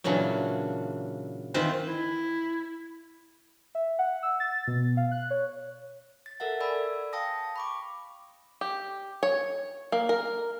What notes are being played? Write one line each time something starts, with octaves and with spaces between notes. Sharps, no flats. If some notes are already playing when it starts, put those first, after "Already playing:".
A#2 C#3 E3 F#3 D4
D#3 E3 C4 F4 B4 C5
E4
E5
F#5
E6
A6
B2
F5
F#6
C#5
A6
A4 A#4 E5 F#5
D5 G#5 B5 E6
F5 G5 A5 D#6 A#6
B5 C#6 D6
G4
C#5
A#3
A#4